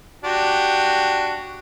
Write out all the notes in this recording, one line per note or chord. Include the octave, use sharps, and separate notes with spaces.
D4 F#4 G4